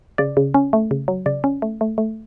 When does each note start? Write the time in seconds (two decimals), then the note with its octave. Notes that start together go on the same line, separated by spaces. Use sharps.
0.18 C#3 D5
0.37 C#3
0.54 C#4
0.73 A3
0.91 C#3
1.08 F#3
1.26 C#3 D5
1.44 C#4
1.62 A3
1.81 A3
1.98 A3